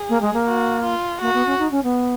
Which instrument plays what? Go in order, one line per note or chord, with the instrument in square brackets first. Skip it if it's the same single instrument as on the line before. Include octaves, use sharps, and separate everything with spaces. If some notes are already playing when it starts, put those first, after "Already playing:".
Already playing: [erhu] G#4
[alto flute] A#3
G#3
A#3
[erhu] F#4
F4
[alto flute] A#3 [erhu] F#4
[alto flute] B3
C#4
D#4
C#4
B3